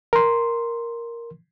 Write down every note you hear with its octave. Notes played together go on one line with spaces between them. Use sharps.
A#4 C6